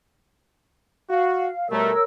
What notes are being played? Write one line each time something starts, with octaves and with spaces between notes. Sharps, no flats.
F#4 F5
B2 G3 A3 A#4 C#5 E6